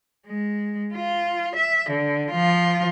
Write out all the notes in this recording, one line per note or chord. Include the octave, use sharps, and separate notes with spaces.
G#3
F4
E5
D3
F3 F4